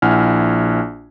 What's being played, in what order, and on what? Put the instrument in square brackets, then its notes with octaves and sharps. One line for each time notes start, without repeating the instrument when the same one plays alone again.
[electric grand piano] A#1 E4 F#5 G#5 F6